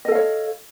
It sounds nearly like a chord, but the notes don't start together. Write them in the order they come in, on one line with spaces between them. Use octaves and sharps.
D#5 A4 F5 C#5